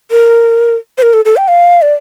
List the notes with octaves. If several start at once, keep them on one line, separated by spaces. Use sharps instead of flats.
A#4
C5
A#4
A4
A4
G5
F5
D5